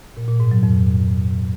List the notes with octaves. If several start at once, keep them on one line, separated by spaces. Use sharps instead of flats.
A#2
A#2
G#2
F#3
F2